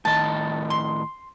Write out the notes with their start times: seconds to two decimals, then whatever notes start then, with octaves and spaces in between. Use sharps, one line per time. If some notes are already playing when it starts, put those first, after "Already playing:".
0.05 A2 D#3 D#5 A5
0.70 C6